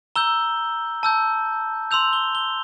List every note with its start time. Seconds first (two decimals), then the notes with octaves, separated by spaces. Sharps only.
0.16 A#5 E6 G6 G7
1.03 A5 E6 G6
1.91 C6 E6 G6 F7
2.13 G7
2.35 G7